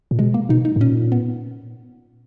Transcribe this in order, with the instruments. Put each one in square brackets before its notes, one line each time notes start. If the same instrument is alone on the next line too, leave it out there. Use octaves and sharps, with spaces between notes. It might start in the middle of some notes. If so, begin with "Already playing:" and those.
[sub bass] A#2
[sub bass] B2 [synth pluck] G#3
[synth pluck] A#3
[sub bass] B2 [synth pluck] D#4
[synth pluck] D#4
[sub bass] G#2
[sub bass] A#2 [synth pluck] C#4
[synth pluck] B3